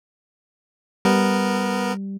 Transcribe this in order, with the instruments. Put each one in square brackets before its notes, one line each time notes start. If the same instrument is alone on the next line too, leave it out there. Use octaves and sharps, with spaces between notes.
[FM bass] G3 [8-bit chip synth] B3 A#4